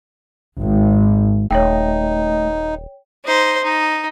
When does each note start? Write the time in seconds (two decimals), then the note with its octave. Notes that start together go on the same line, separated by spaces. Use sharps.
0.61 G#1
1.51 D#1 A3 D#4 C#5 D#5 G5
3.24 D#4 C5
3.64 D#4